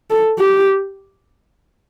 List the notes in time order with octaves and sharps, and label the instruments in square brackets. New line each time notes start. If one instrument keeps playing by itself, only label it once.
[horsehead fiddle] A4
G4